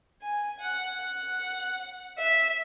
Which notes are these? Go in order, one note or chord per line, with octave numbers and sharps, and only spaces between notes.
G#5
F#5
F#5
E5